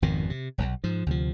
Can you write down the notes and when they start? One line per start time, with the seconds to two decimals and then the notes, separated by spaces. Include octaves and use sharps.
0.02 G#1 F2 B2 D#3
0.30 C3
0.58 E1 B1
0.84 G#2 F3
1.06 D2 C3 F3